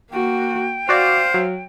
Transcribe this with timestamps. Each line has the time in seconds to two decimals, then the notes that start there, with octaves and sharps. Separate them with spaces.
0.12 A#3 F#4 G5
0.89 F#4 C5 D5 F5
1.34 F#3